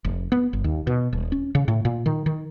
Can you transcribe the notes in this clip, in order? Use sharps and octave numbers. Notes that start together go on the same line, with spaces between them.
F1
B3
G1
D#2
B2
D#1
C#4
C#3
A2
A#2
D#3
D#3